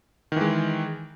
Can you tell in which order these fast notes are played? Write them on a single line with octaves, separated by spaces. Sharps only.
D#3 E3 G#3